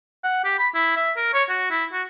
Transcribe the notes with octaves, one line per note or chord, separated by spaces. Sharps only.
F#5
G4
B5
E4
E5
A#4
C#5
F#4
E4
F#4